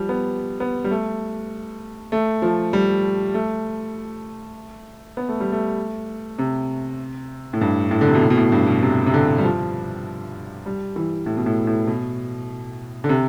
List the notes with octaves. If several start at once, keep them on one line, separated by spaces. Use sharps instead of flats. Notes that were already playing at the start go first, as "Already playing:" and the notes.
Already playing: F3 G3
B3
B3
G3
A3
A3
F3
G3
A3
B3
A3
G3
A3
C3
A2
G2
A2
D3
C3
B2
A2
B2
A2
G2
B2
C3
C3
D3
G3
F3
G3
E3
A2
B2
A2
A2
B2
D3
C3